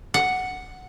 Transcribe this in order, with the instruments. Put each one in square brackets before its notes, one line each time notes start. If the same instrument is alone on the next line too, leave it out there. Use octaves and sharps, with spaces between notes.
[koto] F#5